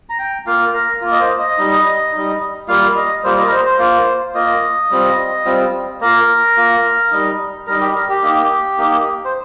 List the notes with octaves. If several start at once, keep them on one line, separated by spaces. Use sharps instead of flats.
A#5
G5
A#3 F4 F5
A#4
A#3 F4
D#5
C5
D#5
G3 D#4
G3 D#4
G3 A#3 F4 F5
D#5
G3 A#3 F4 C5
D#5
A#4
C5
C5
A#3 F4
A#3 F4 D#5
G3 C4 F4
G3 C4 F4
A#3 F4 A#4
A#3 F4
G3 D#4
G3 D#4 A#4
G4
A#4
G4
A#3 D#4
A#3 D#4
C5